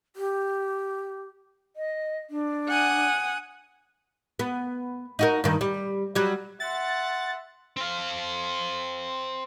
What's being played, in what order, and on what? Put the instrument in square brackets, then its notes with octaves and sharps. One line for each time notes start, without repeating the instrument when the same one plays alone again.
[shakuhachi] G4
[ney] D#5
D4
[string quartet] F#5 G#5 D#6
[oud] B3
D#4 F#4 A#4
G2 D#3
G3
F#3 G3
[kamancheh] E5 C6 [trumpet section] F#5 [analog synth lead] A6
[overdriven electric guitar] C4 F5